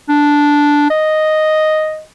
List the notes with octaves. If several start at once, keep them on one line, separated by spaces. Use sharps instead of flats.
D4
D#5